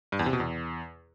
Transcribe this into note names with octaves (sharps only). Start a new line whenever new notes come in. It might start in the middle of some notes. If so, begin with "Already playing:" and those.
G2
E2
C3
B2
E2